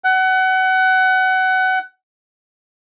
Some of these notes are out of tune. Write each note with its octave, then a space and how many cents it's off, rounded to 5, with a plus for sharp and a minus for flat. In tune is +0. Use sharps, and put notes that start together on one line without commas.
F#5 +25